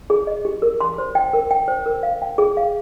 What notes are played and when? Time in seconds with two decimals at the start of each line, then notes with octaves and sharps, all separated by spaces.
0.10 G#4
0.27 D#5
0.45 G4
0.62 A#4
0.81 C6
0.98 C5
1.15 G5
1.33 A#4
1.51 G5
1.68 C5
1.86 A#4
2.03 F5
2.22 G5
2.38 G#4
2.57 F5